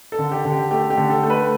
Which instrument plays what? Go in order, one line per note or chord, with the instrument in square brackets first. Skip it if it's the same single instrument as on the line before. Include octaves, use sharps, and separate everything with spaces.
[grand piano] A4
D3
G4
D3
G4
A3 G4
G4
D3
A4
A3
B4